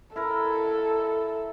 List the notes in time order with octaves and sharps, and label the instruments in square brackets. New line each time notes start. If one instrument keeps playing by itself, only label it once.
[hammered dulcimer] E4 A#4 [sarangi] A4